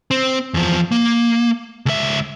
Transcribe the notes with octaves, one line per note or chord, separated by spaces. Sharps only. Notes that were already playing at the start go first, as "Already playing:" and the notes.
C4
E2 F3
A#3
C#2 E5